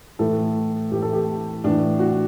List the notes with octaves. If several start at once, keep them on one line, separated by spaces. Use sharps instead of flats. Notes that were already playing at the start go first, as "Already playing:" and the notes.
A2 E3 A4
A2 E3 G4
A4
G4
A2 E3 D4
F#4